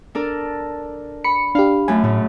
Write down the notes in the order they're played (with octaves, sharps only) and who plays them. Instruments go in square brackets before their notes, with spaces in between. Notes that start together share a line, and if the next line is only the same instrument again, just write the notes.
[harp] D4 A4 A#4
[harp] B5 [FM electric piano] C#7
[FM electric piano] D4 G4 [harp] F5
[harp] F#2 A3 [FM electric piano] G#5
[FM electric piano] A2 [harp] C#3